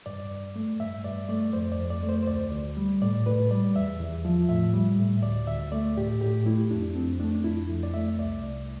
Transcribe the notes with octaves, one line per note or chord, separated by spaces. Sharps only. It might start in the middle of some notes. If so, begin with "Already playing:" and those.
G2 D5
G2
A3
G2 E5
G2 D5
A3 D5
F2 C5
D5
F2
D5
A3
C5
C5
D2 D5
D2
G3
A2 D5
A2 B4
G3 D5
E2 E5
E2
F3
A2 E5
G3
A2
D2 D5
D2 E5
A3 D5
A2 G4
A2 G4
A3 E4
F2 D4
F2 C4
A3 D4
D4
F2 E4
F2
D5
A3 E5
C2 D5
C2